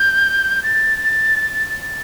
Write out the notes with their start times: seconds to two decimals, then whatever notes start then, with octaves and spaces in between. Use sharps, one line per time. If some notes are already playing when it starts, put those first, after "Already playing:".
Already playing: G6
0.63 A6
1.69 A6